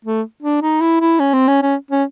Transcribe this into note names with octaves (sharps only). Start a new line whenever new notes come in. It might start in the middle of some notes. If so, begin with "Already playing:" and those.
A3
D4
D#4
E4
E4
C#4
C4
C#4
C#4
C#4